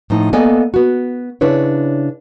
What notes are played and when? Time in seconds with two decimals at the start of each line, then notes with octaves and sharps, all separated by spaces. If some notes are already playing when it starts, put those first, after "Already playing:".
0.10 A2 F3 D#4
0.33 A#3 B3 A4 D5 D#5 G#5
0.74 B3 F#4
1.41 C#3 D4 E4 B4 C#5